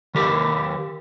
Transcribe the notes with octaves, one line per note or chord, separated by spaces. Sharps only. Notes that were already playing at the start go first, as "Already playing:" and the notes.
D#3 G4 A#4 B4